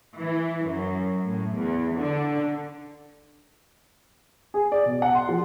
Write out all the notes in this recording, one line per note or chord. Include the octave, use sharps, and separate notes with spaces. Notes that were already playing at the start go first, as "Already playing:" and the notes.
E3
F#2
A2
E2
D3
G#4
D5
B2
F#5
C6
F3